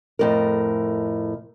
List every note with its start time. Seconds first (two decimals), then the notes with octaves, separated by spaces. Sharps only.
0.19 F2 A2 A#4